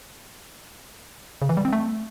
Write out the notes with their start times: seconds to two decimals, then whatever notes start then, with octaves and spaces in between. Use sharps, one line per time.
1.42 C#3
1.49 E3
1.57 G3
1.65 C4
1.73 A3